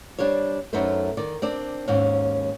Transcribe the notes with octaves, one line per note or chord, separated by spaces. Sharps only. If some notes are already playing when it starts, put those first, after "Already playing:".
G3 D4 G4 C5 C#5
F#2 A3 D#4 B4 C5
D#3 D5
C4 D4 D5
D#2 G#2 C4 C#4